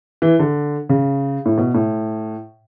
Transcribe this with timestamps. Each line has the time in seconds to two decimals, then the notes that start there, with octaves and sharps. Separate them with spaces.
0.22 E3
0.39 D3
0.89 C#3
1.45 A2
1.58 B2
1.74 A2